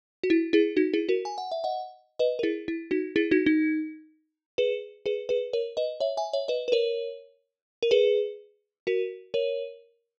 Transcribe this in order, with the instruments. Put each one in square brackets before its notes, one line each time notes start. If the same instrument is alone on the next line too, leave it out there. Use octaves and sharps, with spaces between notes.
[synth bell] F#4
E4
E4 G#4
D#4 F#4
E4 G#4
F#4 A#4
G#5
F#5
E5
D#5 F#5
B4 D#5
A#4
E4 G#4
E4
D#4 F#4
E4 G#4
D#4 F#4
D#4
G#4 B4
G#4 B4
G#4 B4
A#4 C#5
B4 D#5
C#5 E5
E5 G#5
C#5 E5
B4 D#5
B4
A#4 C#5
A#4
G#4 B4
F#4 A#4
A#4 C#5